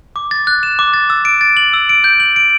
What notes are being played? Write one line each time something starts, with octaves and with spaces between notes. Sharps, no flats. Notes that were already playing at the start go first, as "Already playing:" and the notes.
D6
A6
F#6
E7
D6
A6
E6
D7
A6
F#7
E6
D7
G6
F#7
D7